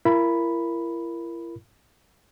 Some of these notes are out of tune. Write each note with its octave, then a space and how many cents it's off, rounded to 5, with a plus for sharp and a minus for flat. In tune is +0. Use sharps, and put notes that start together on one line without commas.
E4 +40 A#4 +0 B5 +0